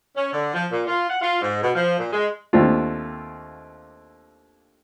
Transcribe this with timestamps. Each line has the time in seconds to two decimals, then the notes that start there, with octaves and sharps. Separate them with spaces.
0.16 C#4
0.33 D3
0.54 F3
0.71 A#2
0.87 F4
1.09 F#5
1.21 F4
1.42 G#2
1.62 B2
1.75 F3
1.99 A#2
2.13 G#3
2.53 D#2 A3 C4 D4 F4